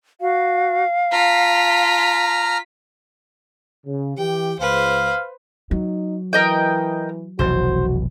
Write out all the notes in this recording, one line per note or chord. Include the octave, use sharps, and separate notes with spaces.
F#4 F5
F4 A5 A#5 F6 B6
C#3
E3 G4 G5
C#2 B4 C5 F5
F#3 D#4
E3 A#4 D#5 G5
F1 B1 E3 F#4 C5